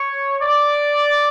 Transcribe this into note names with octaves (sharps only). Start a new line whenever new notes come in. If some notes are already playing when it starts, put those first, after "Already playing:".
Already playing: C#5
D5